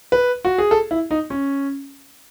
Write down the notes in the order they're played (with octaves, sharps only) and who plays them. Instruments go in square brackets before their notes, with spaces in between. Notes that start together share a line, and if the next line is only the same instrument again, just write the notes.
[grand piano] B4
F#4
G#4
A4
E4
D#4
C#4